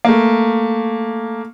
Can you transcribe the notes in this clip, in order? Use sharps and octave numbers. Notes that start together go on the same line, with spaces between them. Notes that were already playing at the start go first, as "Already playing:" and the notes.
A3 A#3